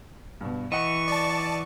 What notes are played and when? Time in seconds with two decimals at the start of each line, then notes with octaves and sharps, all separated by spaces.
0.41 G2 B2
0.72 E3 D#5 F#5 C#6
1.08 D5 A5